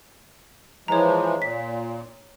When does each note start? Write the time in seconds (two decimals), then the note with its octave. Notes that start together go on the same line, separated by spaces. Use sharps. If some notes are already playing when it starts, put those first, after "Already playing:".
0.88 E3 F3 G#3 C#5 A#5
1.42 A#2 B6